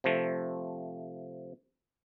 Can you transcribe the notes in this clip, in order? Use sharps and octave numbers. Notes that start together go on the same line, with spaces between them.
C3 F3 A3